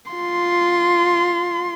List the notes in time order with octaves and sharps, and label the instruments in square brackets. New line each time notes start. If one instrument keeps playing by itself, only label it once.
[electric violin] F4 C6